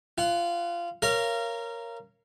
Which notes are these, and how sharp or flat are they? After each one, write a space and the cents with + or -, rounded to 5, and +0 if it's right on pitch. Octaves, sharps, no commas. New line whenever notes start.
F4 -20 F#5 +10
A#4 +0 C#5 +0 F5 -25